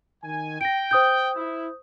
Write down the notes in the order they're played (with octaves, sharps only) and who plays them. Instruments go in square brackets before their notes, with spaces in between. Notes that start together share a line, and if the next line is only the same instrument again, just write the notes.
[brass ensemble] D#3 G#5
[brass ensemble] G5 [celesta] A#6 D7
[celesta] C5 D#6 G6
[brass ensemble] E4